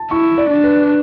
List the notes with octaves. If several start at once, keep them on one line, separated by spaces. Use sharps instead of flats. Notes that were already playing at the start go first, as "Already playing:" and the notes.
Already playing: A5
E4 C#6
D5
D4
B4